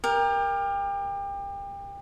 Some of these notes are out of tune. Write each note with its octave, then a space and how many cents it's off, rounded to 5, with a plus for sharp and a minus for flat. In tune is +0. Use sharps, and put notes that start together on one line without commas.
G4 +30 A#4 +10